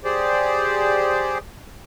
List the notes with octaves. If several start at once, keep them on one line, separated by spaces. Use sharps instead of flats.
G4 G#4 C5 D5